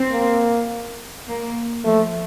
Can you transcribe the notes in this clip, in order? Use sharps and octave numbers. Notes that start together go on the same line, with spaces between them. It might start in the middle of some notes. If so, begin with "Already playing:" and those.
Already playing: C4
A#3
A#3
F3 A3